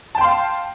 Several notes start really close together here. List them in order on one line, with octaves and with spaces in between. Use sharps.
A5 G5 C6 F5